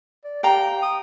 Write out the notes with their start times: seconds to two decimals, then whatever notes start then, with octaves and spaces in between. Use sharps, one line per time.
0.24 D5
0.43 G4 F5 G5 A#5
0.82 D#6